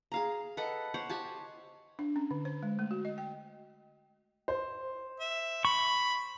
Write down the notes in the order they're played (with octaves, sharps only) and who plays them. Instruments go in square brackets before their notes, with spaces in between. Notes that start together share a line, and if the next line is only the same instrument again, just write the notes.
[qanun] G#4 F5 A#5
A4 B4 D#5 F#5
C5 C#5 F#5
G4 G#5 A5
[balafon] D4
C#4
D3
C5
G#3
A3
F#4
D#5
G5
[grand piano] C5
[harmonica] E5
[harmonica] B5 [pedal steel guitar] C#6